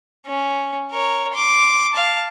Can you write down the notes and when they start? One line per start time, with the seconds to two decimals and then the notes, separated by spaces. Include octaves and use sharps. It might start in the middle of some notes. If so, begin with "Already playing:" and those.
0.27 C#4
0.91 A#4 C#5
1.34 C6 D6
1.93 F5 A5